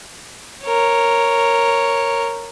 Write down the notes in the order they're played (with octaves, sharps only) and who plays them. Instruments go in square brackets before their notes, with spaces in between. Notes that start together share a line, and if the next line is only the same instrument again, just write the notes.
[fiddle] A#4 C#5